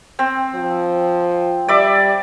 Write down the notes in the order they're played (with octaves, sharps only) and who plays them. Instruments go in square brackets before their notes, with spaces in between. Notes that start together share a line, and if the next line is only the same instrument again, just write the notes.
[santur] C4
[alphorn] F3
[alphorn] G3 [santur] D5 E5 D6